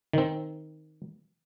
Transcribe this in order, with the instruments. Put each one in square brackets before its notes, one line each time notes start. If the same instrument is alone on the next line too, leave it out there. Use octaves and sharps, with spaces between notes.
[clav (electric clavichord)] D#3 C4